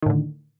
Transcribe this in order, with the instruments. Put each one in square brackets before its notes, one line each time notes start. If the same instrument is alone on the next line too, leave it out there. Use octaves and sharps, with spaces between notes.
[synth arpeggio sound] D#3
A2
D3